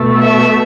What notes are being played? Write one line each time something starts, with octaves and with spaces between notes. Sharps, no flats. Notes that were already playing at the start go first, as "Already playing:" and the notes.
Already playing: B2 A3
E5